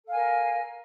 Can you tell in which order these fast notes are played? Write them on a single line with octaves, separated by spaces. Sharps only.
A4 F5 G#5 A#4